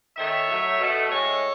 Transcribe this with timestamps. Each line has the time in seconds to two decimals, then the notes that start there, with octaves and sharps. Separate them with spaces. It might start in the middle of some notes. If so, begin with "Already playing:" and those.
0.17 D#3 A3 C#5 E5
0.48 A2 F#3 A3
0.79 B2 A3
1.10 A2 G#3 A4 C#5